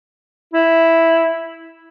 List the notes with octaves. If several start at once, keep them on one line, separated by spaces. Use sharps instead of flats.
E4